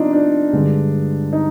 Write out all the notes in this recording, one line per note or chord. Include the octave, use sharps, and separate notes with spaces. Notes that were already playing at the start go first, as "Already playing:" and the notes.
Already playing: C3 F3 B3 D4 D#4 F4
D4
G2 D3 G#3
D#4